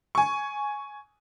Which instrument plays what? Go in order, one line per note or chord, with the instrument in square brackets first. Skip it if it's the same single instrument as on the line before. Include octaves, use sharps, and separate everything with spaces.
[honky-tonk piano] G#5 C#6